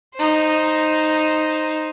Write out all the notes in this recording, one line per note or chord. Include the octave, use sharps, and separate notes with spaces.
D#4 C5